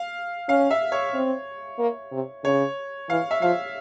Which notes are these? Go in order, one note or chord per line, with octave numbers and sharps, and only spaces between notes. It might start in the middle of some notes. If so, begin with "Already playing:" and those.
Already playing: F5
C#4 F5
E5
C#5
C4
A#3
C3
C#3 C#5
E3 F5
E5
F3 F5